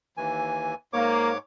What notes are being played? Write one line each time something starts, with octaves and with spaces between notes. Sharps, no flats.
D#2 E3 G#5
G#2 A#3 C#5 D6